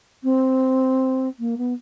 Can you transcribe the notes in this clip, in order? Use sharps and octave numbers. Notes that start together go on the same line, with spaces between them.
C4
A#3
B3